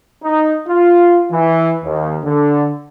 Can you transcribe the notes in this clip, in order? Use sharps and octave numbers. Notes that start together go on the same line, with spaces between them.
D#4
F4
E3
D#2
D3